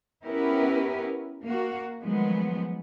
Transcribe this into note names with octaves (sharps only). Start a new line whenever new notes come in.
B3 C#4 E4 G4 A#4 B4
A#3 F#4
D#3 F3 F#3 G#3 A3 B3